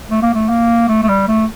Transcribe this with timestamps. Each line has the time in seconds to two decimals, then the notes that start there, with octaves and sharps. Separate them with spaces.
0.10 A3
0.22 A#3
0.34 A3
0.49 A#3
0.88 A3
1.03 A3
1.08 G3
1.28 A3